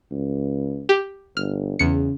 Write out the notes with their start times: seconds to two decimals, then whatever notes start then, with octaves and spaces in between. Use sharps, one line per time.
0.11 C#2
0.89 G4
1.37 G1 F6
1.79 E2 C#3 C#7